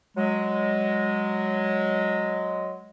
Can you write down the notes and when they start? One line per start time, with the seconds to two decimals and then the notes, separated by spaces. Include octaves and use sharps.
0.17 F#3 G#3